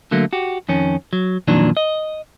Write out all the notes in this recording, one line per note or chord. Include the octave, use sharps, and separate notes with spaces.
D3 F#3 A3 A#3
F#4 G4
F2 D#3 C#4
F#3
F2 A#2 D#3 E3 F#3 D4
D#5